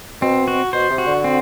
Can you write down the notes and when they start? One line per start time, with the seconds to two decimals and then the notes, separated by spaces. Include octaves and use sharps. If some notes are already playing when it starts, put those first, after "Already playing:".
0.22 B2 C4
0.48 F#4
0.73 B2 C5
0.90 C3
0.98 F#4
1.06 D3
1.24 C4